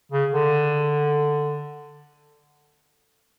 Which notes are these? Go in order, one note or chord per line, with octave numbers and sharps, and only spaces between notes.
C#3
D3